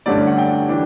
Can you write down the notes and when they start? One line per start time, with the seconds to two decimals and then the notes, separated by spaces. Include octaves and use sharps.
0.06 G2 D3 A3 C#4 D5
0.27 F#5
0.38 G5
0.69 E3 D4